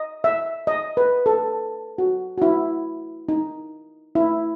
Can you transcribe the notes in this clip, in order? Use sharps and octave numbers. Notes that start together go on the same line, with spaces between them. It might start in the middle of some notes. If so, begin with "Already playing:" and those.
Already playing: D#5
E5
D#5
B4
A4
F#4
F#4
E4
D#4
E4